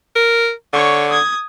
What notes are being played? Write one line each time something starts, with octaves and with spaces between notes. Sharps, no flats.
A#4
D3 C#5 C#6
D#6 G#6